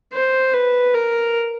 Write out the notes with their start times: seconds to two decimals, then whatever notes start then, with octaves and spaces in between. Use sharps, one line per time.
0.14 C5
0.54 B4
0.94 A#4